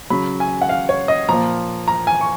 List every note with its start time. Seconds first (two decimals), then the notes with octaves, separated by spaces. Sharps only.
0.10 C#3 F#3 B5
0.40 G#5
0.62 F#5
0.69 F5
0.89 C#5
1.08 D#5
1.29 A#2 F3 A#5
1.88 A#5
2.07 G#5
2.21 C#6